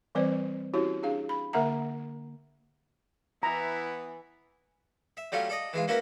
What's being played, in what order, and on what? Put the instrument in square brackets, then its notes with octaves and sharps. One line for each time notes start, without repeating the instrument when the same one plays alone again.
[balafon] E3 G3 C4 B4 C5 D5
C#4 E4 F#4 G4 C#5
D4 G#4 F5
B5
D3 A#3 A#4 E5 F#5 A#5
[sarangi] E3 [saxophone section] B3 [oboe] E4 [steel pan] A#5
[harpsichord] E5
F#3 G3 A3 C#4 F4
A4 D5 D#5
E3 G#3 F4
A#3 C#4 E4 F#4 A#4 B4